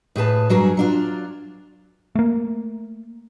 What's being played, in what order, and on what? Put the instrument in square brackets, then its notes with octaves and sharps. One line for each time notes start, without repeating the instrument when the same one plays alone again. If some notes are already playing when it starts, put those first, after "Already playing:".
[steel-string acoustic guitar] A2 G#4 B4 A5
G2 F#3 G#4 A#4
F#3 D4 F4
[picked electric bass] A3 A#3